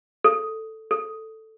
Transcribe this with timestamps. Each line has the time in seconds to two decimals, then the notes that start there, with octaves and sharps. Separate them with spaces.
0.24 A4
0.91 A4